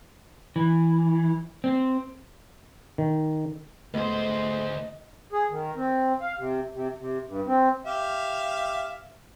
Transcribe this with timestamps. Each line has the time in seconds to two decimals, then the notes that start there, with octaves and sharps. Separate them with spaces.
0.56 E3
1.64 C4
2.98 D#3
3.94 D2 G#2 A3 B3 C5 D#5
5.33 G#4
5.50 D#3
5.76 C4
6.21 F5
6.38 C3
6.74 C3
6.97 C3
7.27 G2
7.46 C4
7.85 G4 E5 F5